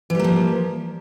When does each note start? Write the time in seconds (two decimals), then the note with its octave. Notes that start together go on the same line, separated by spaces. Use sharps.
0.10 E3
0.15 G3
0.19 A#3
0.24 F3